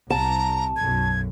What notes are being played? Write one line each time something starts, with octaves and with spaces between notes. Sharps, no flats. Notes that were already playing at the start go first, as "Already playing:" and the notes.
C2 A5 A#5
B1 F#2 G#6